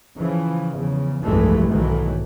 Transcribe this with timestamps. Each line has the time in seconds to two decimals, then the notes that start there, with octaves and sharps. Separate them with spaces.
0.17 C#3 E3 F3
0.75 E2 C#3
1.23 F1 B1 G2 E3 G#3 A3
1.70 B1 G#2 D#3 E3 F#3 A3